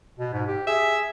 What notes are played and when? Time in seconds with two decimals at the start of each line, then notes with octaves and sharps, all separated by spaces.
0.19 B2
0.33 G#2
0.47 G4
0.67 G#4 E5